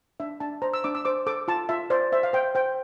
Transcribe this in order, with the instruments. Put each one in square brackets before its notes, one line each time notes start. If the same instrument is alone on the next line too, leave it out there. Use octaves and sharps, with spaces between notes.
[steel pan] D4 E5
D4 A5
C5 A#5
E6
D4 D6
E6
C5 D6
A4 D6
F4 A5
F4 E5
C5 D5
C5 E5
F5
C5 G5
C5 G5